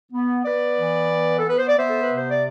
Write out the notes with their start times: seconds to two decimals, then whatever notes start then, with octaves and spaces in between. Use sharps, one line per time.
0.12 B3
0.44 B3 B4 D5
0.77 E3
1.10 B3
1.38 A4
1.43 B3 B4
1.57 C5
1.67 D5
1.76 B3 C5 E5
1.89 A4
2.02 B4
2.09 C3
2.16 C5
2.29 D5